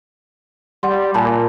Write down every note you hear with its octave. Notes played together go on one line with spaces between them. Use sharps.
G3 F#5 C6
A#2 G#5 A5 B5